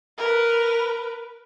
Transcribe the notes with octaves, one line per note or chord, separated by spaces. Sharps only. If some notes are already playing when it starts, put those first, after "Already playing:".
A#4 B4